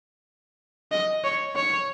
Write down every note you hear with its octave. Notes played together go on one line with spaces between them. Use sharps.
D#5
C#5
C#5